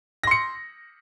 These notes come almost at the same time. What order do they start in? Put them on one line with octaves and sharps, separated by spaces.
A#6 C6 C#7